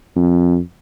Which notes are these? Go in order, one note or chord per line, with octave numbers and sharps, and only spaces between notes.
F2